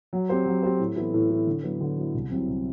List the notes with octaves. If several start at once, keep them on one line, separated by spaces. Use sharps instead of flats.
F#3
C4 G4 C5
F#3
C4 G4 C5
A2
E3 B3 E4 A4
A2
E3 B3 E4 A4
D3
F#3 B3 E4
D3
F#3 B3 E4
C2
C3 F#3 C4 E4
C2